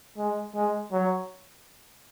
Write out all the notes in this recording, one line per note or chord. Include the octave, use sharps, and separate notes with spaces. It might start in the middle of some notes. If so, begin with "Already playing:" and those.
G#3
G#3
F#3